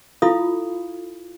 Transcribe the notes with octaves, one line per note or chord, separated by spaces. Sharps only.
E4 F4 A4 F5 B5 D#6